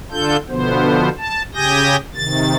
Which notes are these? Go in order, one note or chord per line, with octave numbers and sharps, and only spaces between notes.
D3 D4 F4 A4 G6
B2 D3 F3 B3 C5
A5
C#3 G4 G#5 D#6 G6 A#6
C3 D#3 A6